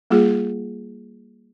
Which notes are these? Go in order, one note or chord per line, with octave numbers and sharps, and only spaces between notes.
G3 A#3 F4 G#4